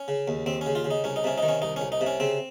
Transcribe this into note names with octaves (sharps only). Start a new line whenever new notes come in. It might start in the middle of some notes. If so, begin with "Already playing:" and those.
Already playing: C#4
C#3
D#2
D#2 C4
C#4
C#3
F4
C#3
D#4
C2 C#4
D#4
C3 C#4
D#3 D#4
C#4
C2 D#4
C#4
C2
D#4
C3
C#4
C#3 C4